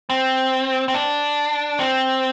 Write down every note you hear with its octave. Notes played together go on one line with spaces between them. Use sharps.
C4
C4
D4
C4